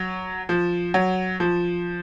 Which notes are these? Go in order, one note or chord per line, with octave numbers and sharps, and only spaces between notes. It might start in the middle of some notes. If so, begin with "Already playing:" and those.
Already playing: F#3
F3
F#3
F3